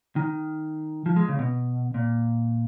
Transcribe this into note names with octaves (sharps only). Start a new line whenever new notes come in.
D#3
F3
G#3
C#3
B2
A#2